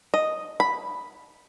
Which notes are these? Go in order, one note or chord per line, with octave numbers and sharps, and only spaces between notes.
D#5
B5